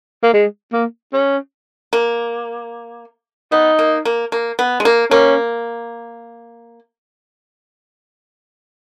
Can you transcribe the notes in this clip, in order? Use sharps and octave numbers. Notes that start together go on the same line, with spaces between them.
A#3
G#3
A#3
C#4
A#3
B3 D#4
A#3
A#3
A#3
B3
G#3
A#3
A#3 C#4